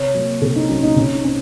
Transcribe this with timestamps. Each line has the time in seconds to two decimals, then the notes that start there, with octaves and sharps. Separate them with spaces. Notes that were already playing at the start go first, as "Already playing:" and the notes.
Already playing: C3 C#5
0.14 F#3 A#3
0.41 C3 A4
0.56 D#4
0.69 F#3 A#3 C#4
0.83 D#4
0.96 C3 C#4
1.14 D#4
1.24 C4 C#4